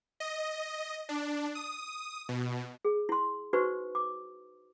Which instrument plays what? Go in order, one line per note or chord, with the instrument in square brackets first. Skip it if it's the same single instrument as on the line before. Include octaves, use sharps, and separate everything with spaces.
[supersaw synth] D#5
D4
D#6
B2
[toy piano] G#4
E4 C6
D#4 F#4 B4 C5 C#6
D6